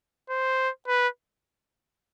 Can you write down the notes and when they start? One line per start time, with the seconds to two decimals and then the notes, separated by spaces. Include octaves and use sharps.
0.30 C5
0.88 B4